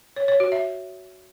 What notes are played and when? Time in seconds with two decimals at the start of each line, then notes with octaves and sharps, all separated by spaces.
0.16 C#5
0.28 C#5
0.40 F#4
0.52 E5